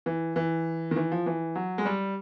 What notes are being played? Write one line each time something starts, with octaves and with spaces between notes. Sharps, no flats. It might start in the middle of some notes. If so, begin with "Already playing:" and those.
E3
E3
D#3
E3
F3
E3
F#3
G#3
G3